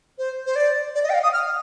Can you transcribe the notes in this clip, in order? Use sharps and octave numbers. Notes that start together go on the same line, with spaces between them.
C5
C5
D5
D5
D#5
G5
F5
D#6
F6